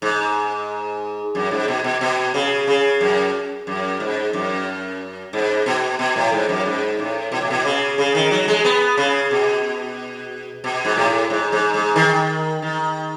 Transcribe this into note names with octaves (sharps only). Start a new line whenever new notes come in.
G#2
F#2
G#2
B2
B2
B2
C#3
C#3
F#2
F#2
G#2
F#2
G#2
B2
B2
A2
G#2
F#2
G#2
A2
B2
A2
B2
C#3
C#3
D#3
F#3
G#3
B3
C#3
B2
B2
G#2
A2
G#2
G#2
G#2
D#3
D#3